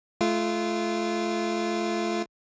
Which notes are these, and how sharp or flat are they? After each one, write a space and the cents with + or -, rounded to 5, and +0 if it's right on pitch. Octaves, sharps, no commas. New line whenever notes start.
A3 -30 F4 -20